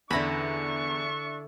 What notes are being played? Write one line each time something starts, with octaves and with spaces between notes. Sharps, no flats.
E2 D3 D4 E4 E5 B5 C#6 A#6